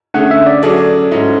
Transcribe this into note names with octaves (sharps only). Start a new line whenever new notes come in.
D3 A3 C#4 G#4 F#5
E5
D5
F#3 C#4 G#4 A4 D5
G#2 G#3 C#4 E4